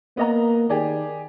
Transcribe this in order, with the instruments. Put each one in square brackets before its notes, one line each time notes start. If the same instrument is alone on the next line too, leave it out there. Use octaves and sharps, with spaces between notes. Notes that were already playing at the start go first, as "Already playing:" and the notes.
[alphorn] A#3 [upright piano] B3 D#5 A#5
[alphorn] D#3 [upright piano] G4 G#4 D5